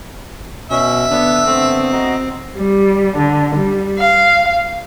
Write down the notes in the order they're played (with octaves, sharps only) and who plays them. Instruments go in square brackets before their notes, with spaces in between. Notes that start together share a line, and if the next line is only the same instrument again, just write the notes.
[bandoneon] B2 C#4 [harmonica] E5
[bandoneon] D3 D4 [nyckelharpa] B3
[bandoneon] D3 A3 B3 [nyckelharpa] C4
[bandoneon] F#4 D#5 A#5
[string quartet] G3
D3
G3
F5